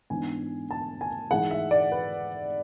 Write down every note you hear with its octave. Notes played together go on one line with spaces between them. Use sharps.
G#2 E3 B3 D4 G#5
A5
G#5
G#2 E3 G#3 F#5
E5
D5
B4